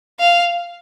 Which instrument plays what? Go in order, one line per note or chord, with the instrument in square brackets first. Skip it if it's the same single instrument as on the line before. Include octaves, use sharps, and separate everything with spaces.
[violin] F5